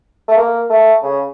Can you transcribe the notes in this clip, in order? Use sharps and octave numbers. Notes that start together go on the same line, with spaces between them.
A3
A#3
A3
C#3